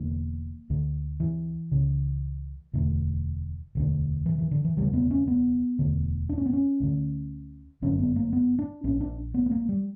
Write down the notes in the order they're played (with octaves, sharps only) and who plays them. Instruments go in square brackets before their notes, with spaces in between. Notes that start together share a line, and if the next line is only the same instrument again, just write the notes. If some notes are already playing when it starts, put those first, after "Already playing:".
Already playing: [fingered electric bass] E1 E2 D3 A#3
D2 D3
E3
C#2 C#3
E1 D2 D3
E1 D2 D3
E3
E3
D3
E3
E1 D2 C#3 G3
B3
C#4
B3
E1 D2 D3
D4
C#4
B3
C#4
D2 D3
G1 F#2 D3 C#4
B3
A#3
B3
D4
A#1 A#2 C#4
D4
B3
B3
A#3
G3